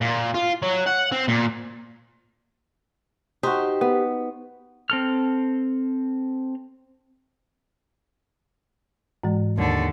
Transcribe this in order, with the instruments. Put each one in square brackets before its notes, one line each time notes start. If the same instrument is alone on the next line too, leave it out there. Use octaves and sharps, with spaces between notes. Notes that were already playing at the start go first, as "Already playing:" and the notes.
[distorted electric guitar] A#2
F4
F#3
F#5
C4
A#2
[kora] D#4 F#4 [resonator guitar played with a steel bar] G4 C5
[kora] B3
[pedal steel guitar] C4 A4 F6
[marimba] G#2 E3 G#3
[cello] D#2 D3